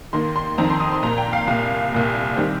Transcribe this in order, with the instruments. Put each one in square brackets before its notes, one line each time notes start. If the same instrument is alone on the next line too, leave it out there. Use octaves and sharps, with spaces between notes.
[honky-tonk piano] D#2 D#3 A#3 C6
C6
F2 D#3 C4 A#5
C6
D#6
C6
A#2 A#3 A#5
G5
F5
C2 A#2 A#3
C2 A#2 A#3
D#3 G3 C4 G4